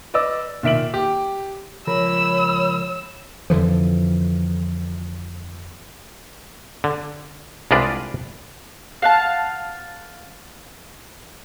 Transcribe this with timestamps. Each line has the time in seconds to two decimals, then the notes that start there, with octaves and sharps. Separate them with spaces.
0.14 B4 D5 D#5 D6 E6
0.63 A#2 D#3 E5 D7 F#7
0.94 G4
1.87 C#2 F3 A#4 C#5 B5 E6
3.50 F2 D3 E3 F3
6.84 D3
7.71 C2 G#3 D4 F4 B4 D5
9.02 F5 F#5 A5